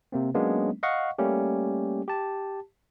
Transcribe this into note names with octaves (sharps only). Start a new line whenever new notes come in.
C3 A#3 C4
F#3 G#3 A#3 B3 C#4 D4
D#5 F5 F#5 C#6
G3 A3 A#3 C#4 G4
G4 A5